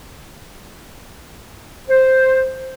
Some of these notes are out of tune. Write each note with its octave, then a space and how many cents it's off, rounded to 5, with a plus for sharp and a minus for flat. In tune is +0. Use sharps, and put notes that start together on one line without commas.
C5 +0